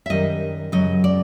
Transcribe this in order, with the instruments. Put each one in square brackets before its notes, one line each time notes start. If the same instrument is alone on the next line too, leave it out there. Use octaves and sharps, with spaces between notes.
[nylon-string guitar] E5
F#2 D#3 G3 D#5
F#2 C#3 F#3 D#5
D5